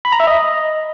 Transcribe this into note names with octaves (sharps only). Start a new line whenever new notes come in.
B5
A#5
E5
D#5